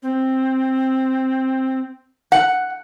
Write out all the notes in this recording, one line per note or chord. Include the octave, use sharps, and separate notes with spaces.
C4
F#5